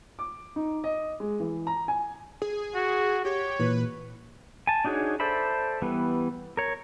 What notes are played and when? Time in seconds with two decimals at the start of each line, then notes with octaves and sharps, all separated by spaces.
0.19 D6
0.56 D#4
0.84 D#5
1.20 G#3
1.40 E3
1.67 A#5
1.88 G#5
2.42 G#4
2.75 F#4
3.25 G4 C#5
3.60 A#2 E3 B4
4.67 G#5 A5
4.85 D4 D#4 F#4 G#4 C#5
5.20 A4 C5 D5 E5 B5
5.82 E3 G3 B3
6.57 A#4 C#5